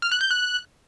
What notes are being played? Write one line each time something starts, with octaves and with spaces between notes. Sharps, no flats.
F6
F#6
G6
F#6